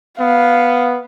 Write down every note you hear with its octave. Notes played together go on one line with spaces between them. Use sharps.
B3 F5